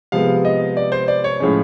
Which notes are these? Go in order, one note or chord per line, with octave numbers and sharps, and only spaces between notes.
C3 F3 G#3 B3 F5
D#5
D5
C5
D5
C#5
A2 F3 G#3 C#4